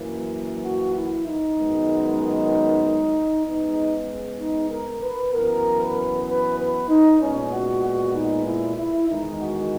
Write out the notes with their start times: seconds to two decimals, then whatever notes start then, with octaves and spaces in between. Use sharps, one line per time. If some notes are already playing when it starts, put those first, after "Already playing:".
Already playing: F#2 E3 A#3
0.64 F#4
0.95 E4
1.27 D#4
1.58 F#2 D#3 G#3 B3
3.45 C#3 G#3 B3 D#4
4.39 D#4
4.70 A#4
5.02 B4
5.33 F#2 E3 B3 A#4
5.79 B4
6.27 B4
6.58 B4
6.89 D#4
7.20 A#2 G#3 B3 C#4
7.52 F#4
7.83 F#4
8.14 D#4
8.46 E4
8.76 E4
9.08 E2 D#3 G#3 D#4
9.40 F#4